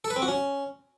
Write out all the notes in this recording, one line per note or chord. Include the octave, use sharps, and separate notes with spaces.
A4
B4
C4
F#4
C#4